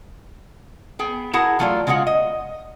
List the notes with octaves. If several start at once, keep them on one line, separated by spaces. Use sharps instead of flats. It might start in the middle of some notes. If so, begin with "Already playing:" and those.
B3 G#4 G5
E4 F#4 G#4 A#4 F#5 A5
E3 F#3 A3 F4 C5 D5
C#3 G#3 F4 F#4 F#5
D#5